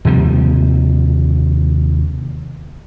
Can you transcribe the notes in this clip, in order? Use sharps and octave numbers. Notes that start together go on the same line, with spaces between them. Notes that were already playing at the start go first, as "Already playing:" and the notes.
D#2 C3 F3 G3